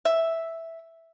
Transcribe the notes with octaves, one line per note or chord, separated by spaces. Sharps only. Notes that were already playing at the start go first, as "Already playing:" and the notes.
E5